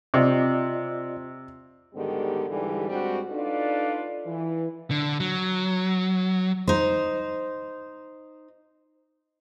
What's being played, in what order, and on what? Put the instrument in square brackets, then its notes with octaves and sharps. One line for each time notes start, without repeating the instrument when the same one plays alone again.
[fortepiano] C3 [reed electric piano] F4 D5 D#5
[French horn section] G#2 D3 D#3 G3 B3 G4
G#2 D3 E3 G3
G2 G3 G#3 C4 F#4
D4 D#4 F4 A4 B4 D5
E3
[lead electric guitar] D3
F#3
[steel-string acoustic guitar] D#4 C5